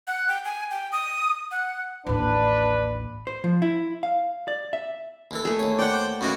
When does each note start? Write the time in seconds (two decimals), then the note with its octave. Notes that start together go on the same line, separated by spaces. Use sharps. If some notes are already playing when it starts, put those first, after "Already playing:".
0.07 F#5
0.28 G5
0.45 G#5
0.71 G5
0.92 D#6
1.51 F#5
2.06 A1 D#2 D4 B4
3.27 C5
3.44 F3
3.62 E4
4.03 F5
4.48 D5
4.73 E5
5.31 D#2 E3 A4
5.45 A3 G#4
5.59 D#2 C#5
5.79 C5 D5 F#5 G5 D6
6.21 F#2 D#3 E3 A#3 B3 F#4